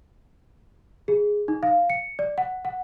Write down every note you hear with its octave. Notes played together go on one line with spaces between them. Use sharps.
G#4
D#4
F5
C#7
D5
F#5
F#5